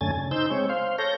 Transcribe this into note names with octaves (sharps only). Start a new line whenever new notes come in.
F#2 D3 A3 C#4 G#5 A6
C#3
D#4 C5 E6 G6
G#3 C4 C#5
C5 F5
A4 C#5 G6 A#6